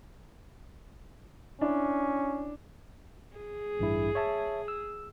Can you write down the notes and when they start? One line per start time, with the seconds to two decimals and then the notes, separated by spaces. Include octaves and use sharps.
1.61 C#4 D4 E4
3.36 G#4
3.79 A1 G2 E4
4.15 C#5 E5 A5
4.68 E6